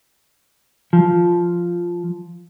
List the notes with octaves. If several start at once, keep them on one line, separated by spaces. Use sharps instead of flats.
F3